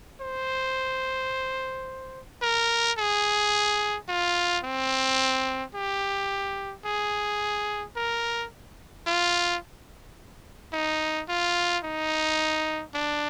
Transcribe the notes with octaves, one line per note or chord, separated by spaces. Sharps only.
C5
A#4
G#4
F4
C4
G4
G#4
A#4
F4
D#4
F4
D#4
D4